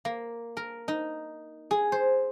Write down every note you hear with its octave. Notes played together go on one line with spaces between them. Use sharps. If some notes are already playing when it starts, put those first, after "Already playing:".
A#3
A#4
D#4
G#4
C5